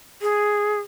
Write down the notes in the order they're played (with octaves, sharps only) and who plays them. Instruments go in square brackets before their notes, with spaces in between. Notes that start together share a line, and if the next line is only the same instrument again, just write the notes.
[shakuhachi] G#4